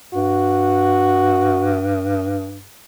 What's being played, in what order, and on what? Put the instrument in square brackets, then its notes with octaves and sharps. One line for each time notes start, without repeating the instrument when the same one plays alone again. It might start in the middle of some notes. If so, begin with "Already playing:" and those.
[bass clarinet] G2 [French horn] F#4